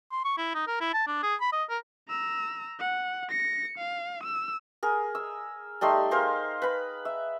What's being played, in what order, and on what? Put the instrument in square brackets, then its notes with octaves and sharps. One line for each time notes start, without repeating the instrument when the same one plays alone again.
[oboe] C6
C#6
E4
D#4
A#4
E4
A5
D4
G#4
B5
D#5
A#4
[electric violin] A#5 E6
F#5
A#6 C#7
F5
E6
[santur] G#4 A#4
E6
G3 A3 D#4 C6
G#4 A#4 C5 F5
B4 B5
E5